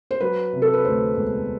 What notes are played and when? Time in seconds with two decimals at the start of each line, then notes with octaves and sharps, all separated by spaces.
0.11 C5
0.20 F#3 B4
0.53 C3
0.62 A4
0.74 B4
0.85 D2 C5
1.16 E1